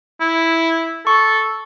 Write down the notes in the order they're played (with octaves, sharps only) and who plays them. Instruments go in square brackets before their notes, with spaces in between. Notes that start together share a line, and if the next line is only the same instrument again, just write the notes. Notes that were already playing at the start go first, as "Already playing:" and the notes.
[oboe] E4
[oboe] A4 [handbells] C#6